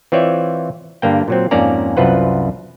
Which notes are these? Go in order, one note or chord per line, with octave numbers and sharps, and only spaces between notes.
E3 C4 F4 C#5 D5 E5
G2 D3 A#3 G5
A#2 F#3 C4
F2 G#2 A#3 C#4 D5 A#5
C2 F#2 F4 B4 C5 F#5